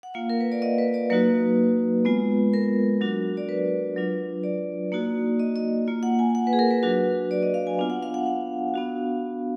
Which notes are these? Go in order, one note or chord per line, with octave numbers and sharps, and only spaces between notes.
F#5
A#3 F4 F5
A#4
B4
D5
D#5
B4
D5
F#3 A#3 D#4 F#4 B4
G#3 B3 F4
A#4
F#3 D4 F#4
D5
B4
F#3 D4 F4
D5
A#3 D#4 F#4
D#5
D#5
A#3 F4
F#5
G#5
F#5
B4
G#4
A#4
B4
F#3 D4 F#4 B4
D5
D#5
F5
G#5
B3 D4 F4
F#5
F5
F#5
F5
B3 D4 F#4